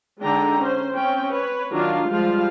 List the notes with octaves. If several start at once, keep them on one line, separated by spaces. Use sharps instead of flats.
D3 G#3 D4 D#4 G5 A#5
C#4 C5
C4 C#4 G5
B4 C#5
D#3 F#3 D4 F4 F5
F3 G3 G#3 F4 F5